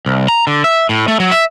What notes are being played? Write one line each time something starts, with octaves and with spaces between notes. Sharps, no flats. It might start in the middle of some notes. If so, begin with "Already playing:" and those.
C2
A#5
D3
E5
A2
A3
F#3
E5